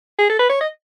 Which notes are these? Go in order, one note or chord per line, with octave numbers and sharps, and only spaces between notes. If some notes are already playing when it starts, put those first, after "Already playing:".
G#4
A4
B4
C#5
D#5